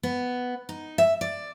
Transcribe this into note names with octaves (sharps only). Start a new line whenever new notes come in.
B3
D#4
E5
D5